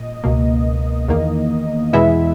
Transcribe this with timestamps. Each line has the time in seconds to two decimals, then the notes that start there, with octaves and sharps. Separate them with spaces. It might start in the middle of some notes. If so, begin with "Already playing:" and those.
Already playing: A#2 D#5
0.24 C#2 B2 A#3
1.08 E2 D#3 A#3
1.93 E2 B2 G#3 B3 E4 E5